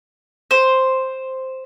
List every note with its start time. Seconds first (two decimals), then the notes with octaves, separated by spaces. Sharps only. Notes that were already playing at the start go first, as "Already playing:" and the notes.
0.51 C5